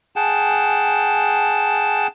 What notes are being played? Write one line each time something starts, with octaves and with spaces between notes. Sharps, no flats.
G#4 F#5 G5 A5